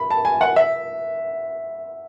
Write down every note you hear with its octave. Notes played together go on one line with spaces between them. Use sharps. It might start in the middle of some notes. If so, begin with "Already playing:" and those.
Already playing: B5
A5
G#5
F#5
E5